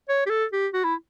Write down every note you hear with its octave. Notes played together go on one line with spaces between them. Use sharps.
C#5
G4
A4
G4
F#4
E4